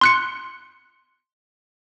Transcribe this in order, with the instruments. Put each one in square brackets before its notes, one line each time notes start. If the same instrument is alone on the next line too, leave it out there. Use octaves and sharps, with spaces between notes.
[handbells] C6 F#6 C#7